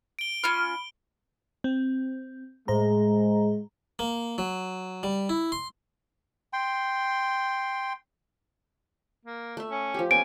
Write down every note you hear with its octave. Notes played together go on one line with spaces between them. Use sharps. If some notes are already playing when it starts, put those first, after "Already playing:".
D7 G7
C#4 F4 B5 F6
C4
A2 G#3 C5 A#5
A#3
F#3
G3
E4
C6
G5 C6
A#3
A3 E5
C#4
F3 G4
A#3 B3 C#4 G#5 D7